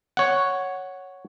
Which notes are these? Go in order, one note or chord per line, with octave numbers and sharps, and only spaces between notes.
C#5 F#5